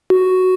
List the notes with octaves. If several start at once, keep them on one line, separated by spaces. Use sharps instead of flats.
F#4